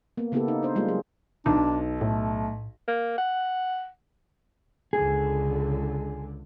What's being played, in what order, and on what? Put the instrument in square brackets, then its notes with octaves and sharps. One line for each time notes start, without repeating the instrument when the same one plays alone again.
[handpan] A#3 B3
C#3 A#3 B3 E4 G4 A4
D#4
D4 C5
G3 G#3 A#3 F4
F#3 G#4
[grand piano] B1 [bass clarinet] D4 [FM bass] D#4
[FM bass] A2 [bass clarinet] A3
[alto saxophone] A#3
F#5
[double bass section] C#2 D3 [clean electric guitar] G#4